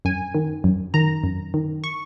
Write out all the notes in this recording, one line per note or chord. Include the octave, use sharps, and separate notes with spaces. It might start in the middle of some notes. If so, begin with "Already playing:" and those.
F#2 G#5
D#3
F#2
D#3 A#5
F#2
D#3
C#6